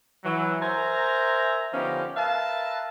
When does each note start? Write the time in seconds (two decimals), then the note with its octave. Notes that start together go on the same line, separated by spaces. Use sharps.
0.24 E3 F#3
0.61 A#4 C5 E5 G#5 A#5
1.73 D3 F3 B3 C#4 D#4 G4
2.16 A#4 B4 E5 F5 A5